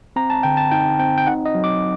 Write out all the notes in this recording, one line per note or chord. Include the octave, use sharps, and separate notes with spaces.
C4 A#5
A5
D3 G5
A5
D#4 G5
C4 G5
G5
D#4 F#5
D#5
F#3
D6